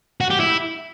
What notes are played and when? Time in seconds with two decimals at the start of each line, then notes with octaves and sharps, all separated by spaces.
0.21 F#4
0.30 G4
0.40 E4